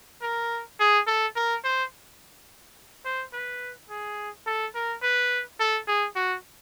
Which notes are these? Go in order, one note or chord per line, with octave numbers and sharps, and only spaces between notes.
A#4
G#4
A4
A#4
C5
C5
B4
G#4
A4
A#4
B4
A4
G#4
F#4